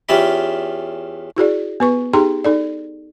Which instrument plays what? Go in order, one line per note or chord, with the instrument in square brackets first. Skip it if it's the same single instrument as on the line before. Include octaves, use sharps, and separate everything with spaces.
[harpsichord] E2 C#4 F4 G4 E5 B5
[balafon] E4 F#4 G#4 D5
B3 B4 C#6
D#4 G4 G#4 G5 A#5 C6
D#4 A4 D5